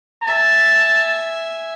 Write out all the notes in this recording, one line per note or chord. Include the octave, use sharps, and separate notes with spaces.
E5 G#5 A5